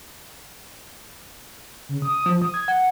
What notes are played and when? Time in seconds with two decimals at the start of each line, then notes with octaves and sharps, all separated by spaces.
1.89 C#3
2.02 D#6
2.26 F3
2.42 D#6
2.54 G#6
2.68 F#5